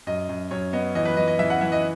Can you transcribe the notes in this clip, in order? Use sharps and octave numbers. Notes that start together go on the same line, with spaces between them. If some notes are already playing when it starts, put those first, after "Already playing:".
F#2 D#5
F#2
F#2 C#5
B3 D#5
E3 D#5
B4
E3 D#5
D#5
E3 E5
F#5
E3 E5
D#5